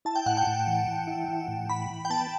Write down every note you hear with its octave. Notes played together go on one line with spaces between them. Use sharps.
E4 A5
G5
A2 F#5
G5
A2
E3
E3
E4
E3
A2
E3 B5
E3
G5
B3 A5